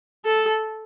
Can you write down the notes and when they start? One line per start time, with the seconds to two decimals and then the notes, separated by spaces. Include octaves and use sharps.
0.25 A4